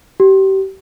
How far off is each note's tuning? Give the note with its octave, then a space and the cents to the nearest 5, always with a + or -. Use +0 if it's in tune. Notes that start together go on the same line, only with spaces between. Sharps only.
G4 -30